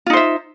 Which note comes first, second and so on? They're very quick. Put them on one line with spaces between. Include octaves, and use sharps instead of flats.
F4 D#4 C5 E5